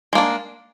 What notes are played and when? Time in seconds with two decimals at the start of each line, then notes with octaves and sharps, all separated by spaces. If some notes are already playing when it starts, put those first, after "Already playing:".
0.13 G#3
0.15 A#3
0.18 D4